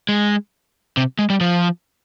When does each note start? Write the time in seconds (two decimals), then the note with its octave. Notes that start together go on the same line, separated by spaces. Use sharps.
0.09 G#3
0.97 C3
1.19 G#3
1.30 G3
1.41 F3